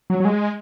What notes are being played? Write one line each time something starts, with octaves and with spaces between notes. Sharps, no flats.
F#3
F#3
G#3